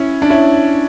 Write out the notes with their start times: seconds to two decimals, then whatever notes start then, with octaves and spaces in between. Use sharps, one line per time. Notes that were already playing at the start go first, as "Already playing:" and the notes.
Already playing: C#4 E4
0.22 D4
0.30 C#4 E4